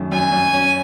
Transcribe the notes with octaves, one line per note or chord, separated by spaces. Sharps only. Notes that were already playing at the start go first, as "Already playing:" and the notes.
Already playing: F#2 D#3 A3
F#2 G#5
F#2
C#4